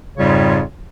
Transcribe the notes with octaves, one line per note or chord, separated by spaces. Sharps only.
F2 G#2 C#3 G3 F4 C#5